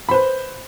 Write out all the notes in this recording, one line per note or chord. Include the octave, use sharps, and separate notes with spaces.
B4 C5 B5